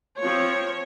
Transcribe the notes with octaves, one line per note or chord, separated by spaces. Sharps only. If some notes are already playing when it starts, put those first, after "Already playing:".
F3 C4 C#5